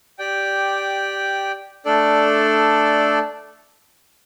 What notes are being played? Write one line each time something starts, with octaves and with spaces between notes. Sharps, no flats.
G4 D5 G5
A3 D4 A4 D5